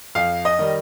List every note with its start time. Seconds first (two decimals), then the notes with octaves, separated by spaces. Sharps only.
0.15 F2 F5
0.45 D#5
0.59 D#3 G3